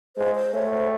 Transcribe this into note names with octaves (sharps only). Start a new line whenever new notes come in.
G#3 C5
C5
A3 C#5
C5